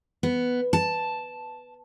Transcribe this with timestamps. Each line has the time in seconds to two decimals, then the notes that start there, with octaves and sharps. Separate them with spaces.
0.23 B3
0.73 A5